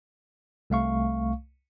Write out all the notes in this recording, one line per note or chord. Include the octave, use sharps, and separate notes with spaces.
C2 A3 F5 C#6